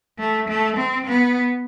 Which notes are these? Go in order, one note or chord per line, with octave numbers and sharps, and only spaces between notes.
A3
A3
C4
B3